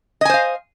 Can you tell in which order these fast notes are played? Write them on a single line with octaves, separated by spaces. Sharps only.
D#5 G#5 C5 F5